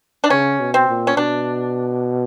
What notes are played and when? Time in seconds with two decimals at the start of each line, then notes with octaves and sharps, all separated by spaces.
0.24 D4
0.30 C#3 C#4
0.60 B2
0.74 C4
0.89 A#2
1.07 C#4
1.17 B2 D4